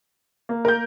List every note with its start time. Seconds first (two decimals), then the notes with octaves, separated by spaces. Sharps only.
0.49 A#3
0.65 A#4 G6